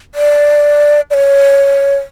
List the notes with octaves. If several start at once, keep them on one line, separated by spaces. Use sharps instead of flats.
D5
D5
C#5